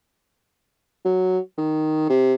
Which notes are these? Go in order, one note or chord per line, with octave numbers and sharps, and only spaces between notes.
F#3
D#3
C3